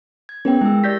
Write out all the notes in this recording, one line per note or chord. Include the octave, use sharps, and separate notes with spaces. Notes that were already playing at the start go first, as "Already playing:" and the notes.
G#6
B3 C#4 G#4 A#4 G5
G#3 E4 E6
G4 D5 G6 A#6 B6